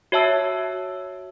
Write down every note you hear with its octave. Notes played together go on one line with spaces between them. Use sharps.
F#4 C#5 E5 A5 E6